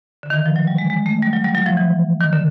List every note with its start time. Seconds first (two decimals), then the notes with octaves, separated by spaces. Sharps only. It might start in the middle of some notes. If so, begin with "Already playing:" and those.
0.23 D3
0.30 D#3
0.34 E3
0.46 F3
0.56 F#3
0.67 G3
0.78 G#3
0.90 G#3
1.06 A3
1.22 G3
1.33 F#3
1.44 G3
1.55 F#3
1.66 F3
1.77 E3
2.21 D#3
2.33 D3